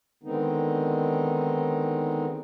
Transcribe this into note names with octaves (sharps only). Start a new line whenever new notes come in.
D3 D#3 G#3 B3 C4 D#4